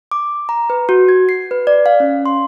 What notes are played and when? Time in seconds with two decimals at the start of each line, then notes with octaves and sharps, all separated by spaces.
0.11 D6
0.49 A#5
0.70 B4
0.89 F#4
1.09 G#6
1.29 C7
1.51 B4
1.67 D5
1.86 F5
2.00 C#4
2.26 C6